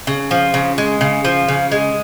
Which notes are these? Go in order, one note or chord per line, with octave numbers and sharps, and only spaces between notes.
C#3
F3
C#3
G#3
C#3
F3
C#3
G#3